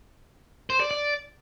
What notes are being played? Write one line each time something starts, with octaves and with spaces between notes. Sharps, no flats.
C5
D5
D5